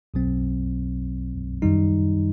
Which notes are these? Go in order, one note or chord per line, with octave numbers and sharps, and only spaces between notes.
B1 B2 F#3 C4
F#2 D#3 G3 D#4